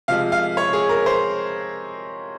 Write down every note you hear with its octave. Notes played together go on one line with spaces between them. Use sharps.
C3 F3 G#3 F5
F5
C#5
G#4
A#4
C5